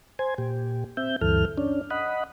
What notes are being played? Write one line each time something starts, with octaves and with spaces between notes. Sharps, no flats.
C5 G#5
A#2 G4
C4 E5 G6
D2 G2 E3 A4 F6
C#4 D4
D#5 F#5 B5